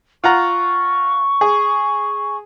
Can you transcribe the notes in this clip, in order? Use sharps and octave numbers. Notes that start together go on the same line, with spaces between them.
F4 F#5 A#5 C#6
G#4